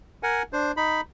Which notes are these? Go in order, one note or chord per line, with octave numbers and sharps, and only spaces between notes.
A#4 F#5 G#5
D4 C5
D#4 B5